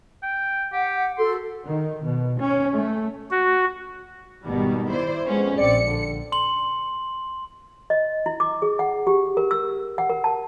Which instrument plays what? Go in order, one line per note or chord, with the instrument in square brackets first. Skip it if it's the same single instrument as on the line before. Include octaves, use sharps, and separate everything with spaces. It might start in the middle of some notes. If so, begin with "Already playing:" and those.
[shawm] G5
[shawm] G4 [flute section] F#5
[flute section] F#4 A4 [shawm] C6
[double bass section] D#3
B2
C#4
A3
[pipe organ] F#4
[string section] G#1 B2 G3 [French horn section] D#3
[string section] E4 C5 D5
[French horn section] F2 B3 C5 [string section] G#3 C#4
[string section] A#1 C#7 [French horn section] C4 D4 D5
[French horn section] D3
[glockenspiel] C6 F#7
[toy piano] D#5
E4
D6
G#4
F#5
G4
A#4
E6
F#5
A#4
A5